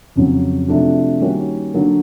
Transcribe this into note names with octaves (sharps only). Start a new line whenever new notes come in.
F2 C#3 F#3
C3 F3 A3 D4 F#4
D#3 G3 A#3 C#4 F#4
D3 F#3 A#3